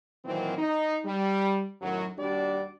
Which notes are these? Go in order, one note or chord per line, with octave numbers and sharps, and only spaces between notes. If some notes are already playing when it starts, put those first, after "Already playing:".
A#2 D#3 E3 F#3 C4
D#4
G3
F#2 A2 D#3 F#3
D#2 G3 D4 F#4 G4 D5